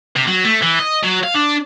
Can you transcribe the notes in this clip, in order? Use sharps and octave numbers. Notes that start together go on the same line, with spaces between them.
C3
F#3
A3
E3
D#5
F#3
F5
D4